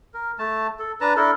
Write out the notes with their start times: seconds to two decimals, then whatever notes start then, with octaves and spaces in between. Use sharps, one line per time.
0.14 A#4
0.39 A3 A5
0.79 A4
1.01 D4 B4 A5 A#5
1.17 D4 E4 A4 A#4